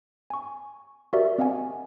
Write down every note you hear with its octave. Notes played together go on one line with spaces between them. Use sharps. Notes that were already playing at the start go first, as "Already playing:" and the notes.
G#5 C#6
F#4 G4 A#4 D5 E5
C4 D#5 F5 F#5 G#5